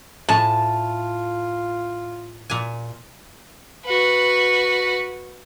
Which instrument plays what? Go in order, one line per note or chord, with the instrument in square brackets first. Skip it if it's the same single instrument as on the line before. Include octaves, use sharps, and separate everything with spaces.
[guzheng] A2 G#5 [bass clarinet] F4 [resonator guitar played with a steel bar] A5
[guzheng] A#2 G#5
[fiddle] F#4 B4